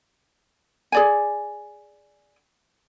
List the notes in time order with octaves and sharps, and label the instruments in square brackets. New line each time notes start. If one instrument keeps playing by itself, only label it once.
[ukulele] G#4 D5 G#5